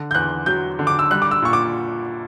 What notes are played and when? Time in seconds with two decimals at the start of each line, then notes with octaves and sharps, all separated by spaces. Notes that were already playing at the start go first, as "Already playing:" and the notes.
Already playing: D3
0.11 G6
0.15 E2 F#6
0.46 F#3 G6
0.79 D3
0.87 D6
0.99 E6
1.11 G3 F#6
1.22 D6
1.31 E6
1.42 A#2 C#6
1.53 D6